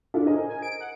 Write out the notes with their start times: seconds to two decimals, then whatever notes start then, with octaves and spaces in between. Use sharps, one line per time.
0.14 D4 E4 F4 A4
0.27 G#4 A#4 C5 D#5
0.49 G#5
0.62 D7
0.81 F#5